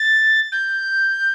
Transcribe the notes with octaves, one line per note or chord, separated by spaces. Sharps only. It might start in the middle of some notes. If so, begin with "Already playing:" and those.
Already playing: A6
G6